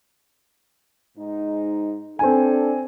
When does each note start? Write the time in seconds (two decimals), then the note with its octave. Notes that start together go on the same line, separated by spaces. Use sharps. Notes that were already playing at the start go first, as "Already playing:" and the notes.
1.18 G#2 D#4
2.19 C4 D4 A4 G#5